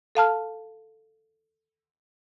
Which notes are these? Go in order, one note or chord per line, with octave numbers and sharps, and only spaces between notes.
A4 F5 A5 F6